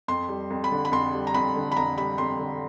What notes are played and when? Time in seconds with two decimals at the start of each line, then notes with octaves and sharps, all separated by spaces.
0.08 F2 C6
0.29 G3
0.50 F2
0.64 B5
0.71 D3
0.85 B5
0.92 F2 C6
1.13 G3
1.27 A#5
1.34 F2 B5
1.55 D3
1.72 B5
1.76 F2 A#5
1.97 G3 B5
2.18 F2 C6
2.39 D3